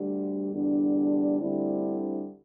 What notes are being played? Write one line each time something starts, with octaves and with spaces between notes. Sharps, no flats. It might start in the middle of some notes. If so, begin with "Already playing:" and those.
Already playing: D2 D3 G3
E2 D3 G3 D4
D2 D3 G3 C4 E4